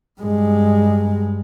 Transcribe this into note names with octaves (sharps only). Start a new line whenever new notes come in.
G2 G#3